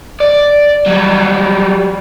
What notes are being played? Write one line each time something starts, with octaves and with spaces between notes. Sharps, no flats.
D5
F#3 G3